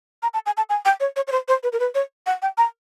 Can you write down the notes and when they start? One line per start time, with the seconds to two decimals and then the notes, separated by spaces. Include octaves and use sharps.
0.23 A#5
0.34 A5
0.46 G#5
0.57 A5
0.70 G#5
0.85 G5
1.00 C#5
1.16 C#5
1.27 C#5
1.32 C5
1.48 C5
1.63 B4
1.72 A#4
1.80 B4
1.95 C#5
2.26 F#5
2.42 G5
2.58 A#5